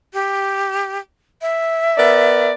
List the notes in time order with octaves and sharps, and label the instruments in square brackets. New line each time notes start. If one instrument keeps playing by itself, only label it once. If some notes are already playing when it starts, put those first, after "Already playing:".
[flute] G4
E5
[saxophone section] B3 A#4 D5